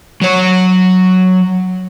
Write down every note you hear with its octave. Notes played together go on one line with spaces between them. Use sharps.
F#3 C#5